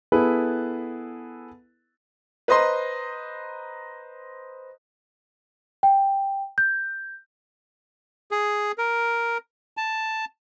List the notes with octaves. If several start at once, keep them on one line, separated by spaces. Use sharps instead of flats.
B3 E4 G#4 A4 B4
B4 C5 D#5 A#5 C6
G5
G6
G#4
A#4
A5